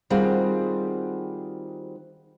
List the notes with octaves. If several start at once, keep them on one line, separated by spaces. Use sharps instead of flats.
D#3 G3 C4 F4 F#4 G#4